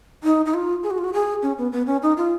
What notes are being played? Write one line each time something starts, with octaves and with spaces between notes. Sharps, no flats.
D#4
D#4
F4
G#4
F#4
F4
F#4
G#4
C#4
B3
B3
C#4
D#4
F4